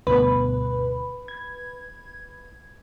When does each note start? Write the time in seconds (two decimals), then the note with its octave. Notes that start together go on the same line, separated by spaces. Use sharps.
0.07 D2 G2 B2 B4
1.28 G#6